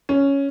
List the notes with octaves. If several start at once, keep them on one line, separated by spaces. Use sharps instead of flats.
C#4